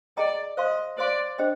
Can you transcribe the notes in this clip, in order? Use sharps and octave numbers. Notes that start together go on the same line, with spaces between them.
G#4 D5 D#5 G5 A#5
C5 D#5 F5 C6
C5 D5 F5 C6
D4 G#4 C5 D#5 G5